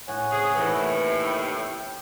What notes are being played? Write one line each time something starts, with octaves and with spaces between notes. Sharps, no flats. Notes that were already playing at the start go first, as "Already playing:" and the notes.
A2 C#5 F#5 G#5
C3 C#4 G#4
D#2 A2 C3 E3 B3
G5